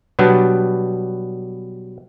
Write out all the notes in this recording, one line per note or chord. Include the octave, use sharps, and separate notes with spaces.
B2 F#3 G3 B3 D4